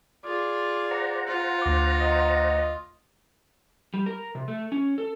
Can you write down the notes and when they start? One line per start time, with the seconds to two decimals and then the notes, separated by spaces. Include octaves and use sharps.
0.25 F4 G#4 D5
0.91 C5 F#5 A#5
1.27 F4
1.61 D2 D6
2.00 D#5
3.94 G3
4.06 A#4
4.35 C3
4.48 A3
4.72 C#4
4.98 A4